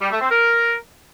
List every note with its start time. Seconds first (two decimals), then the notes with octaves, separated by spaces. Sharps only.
0.01 G3
0.11 A3
0.21 C4
0.31 A#4